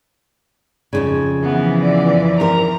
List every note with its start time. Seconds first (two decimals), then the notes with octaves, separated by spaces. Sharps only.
0.93 F2 G#2 C#3
1.43 E3 F3 B3
1.83 D5
2.40 C4 A#4 A#5